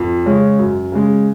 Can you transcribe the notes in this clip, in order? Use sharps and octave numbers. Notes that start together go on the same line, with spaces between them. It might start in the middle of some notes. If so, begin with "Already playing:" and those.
Already playing: F2
C#3 G#3 C#4
F#2
C#3 G#3